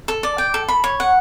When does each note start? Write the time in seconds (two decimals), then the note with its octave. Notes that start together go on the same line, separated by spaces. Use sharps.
0.08 A4
0.23 D5
0.38 G5
0.54 A4
0.68 B5
0.84 C#5
1.00 F#5